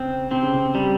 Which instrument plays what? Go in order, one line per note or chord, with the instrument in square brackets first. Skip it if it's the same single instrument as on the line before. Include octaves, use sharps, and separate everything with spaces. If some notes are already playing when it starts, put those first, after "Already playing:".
Already playing: [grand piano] C#3 [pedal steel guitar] C4
[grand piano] C3 [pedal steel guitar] C4
[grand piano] C#3
C3
[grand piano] C3 [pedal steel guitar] G3